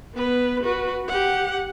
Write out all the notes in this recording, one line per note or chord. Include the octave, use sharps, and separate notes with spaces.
B3 B4
F#4 B4
G4 F#5